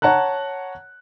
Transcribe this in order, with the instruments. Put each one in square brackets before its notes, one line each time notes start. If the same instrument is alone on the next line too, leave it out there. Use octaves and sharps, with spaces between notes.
[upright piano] C#5 F#5 A5 A#5 F#6